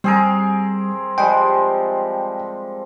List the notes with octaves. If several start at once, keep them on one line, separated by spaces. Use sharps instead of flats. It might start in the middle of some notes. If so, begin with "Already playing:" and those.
G3 C4 G#4 A#4
F3 G3 G#3 G5